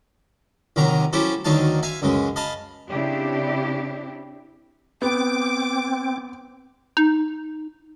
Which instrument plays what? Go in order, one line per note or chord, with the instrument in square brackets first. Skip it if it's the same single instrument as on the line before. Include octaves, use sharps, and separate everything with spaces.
[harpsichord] A#1 D#2 C3 D#3 F#3 A#5
F#3 C#4 E4 G4 A4 C5
D2 D#3 F#3 D#4 F5 A5
E5 F5 G#5
C#2 F#2 C#3 G#3
D#5 F5 A5 B5
[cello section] C#3 C4 D4 E4 G4
[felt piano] B3 [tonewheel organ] C4 [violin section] D6
[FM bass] D#4